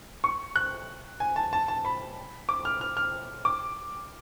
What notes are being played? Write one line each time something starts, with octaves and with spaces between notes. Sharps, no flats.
C#6
F#6
G#5
A5
A5
A5
B5
D6
F6
F6
F6
D6